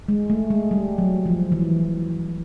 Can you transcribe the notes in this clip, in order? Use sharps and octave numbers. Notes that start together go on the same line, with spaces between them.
G#3
A3
G#3
G3
F#3
F3
E3